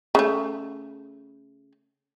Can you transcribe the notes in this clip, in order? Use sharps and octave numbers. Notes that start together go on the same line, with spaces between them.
C#3 A3